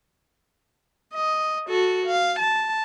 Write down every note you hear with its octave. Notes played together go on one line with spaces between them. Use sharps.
D#5
F#4 A4
F5
A5